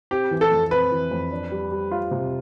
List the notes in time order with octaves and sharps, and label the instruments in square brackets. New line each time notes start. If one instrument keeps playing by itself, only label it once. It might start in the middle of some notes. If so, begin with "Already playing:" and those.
[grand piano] C4 [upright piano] G4
[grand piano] E3
[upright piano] A4
[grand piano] F2
[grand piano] C4 [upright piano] B4
[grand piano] E3
F2
D4
G3
G3
F4
C3